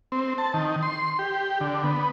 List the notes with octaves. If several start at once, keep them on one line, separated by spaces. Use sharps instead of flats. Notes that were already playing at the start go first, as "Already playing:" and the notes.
C4
A5
D#3
C6
G4
D3
B3